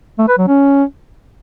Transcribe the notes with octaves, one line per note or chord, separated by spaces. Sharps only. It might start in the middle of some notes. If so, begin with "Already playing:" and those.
A3
B4
F#3
C#4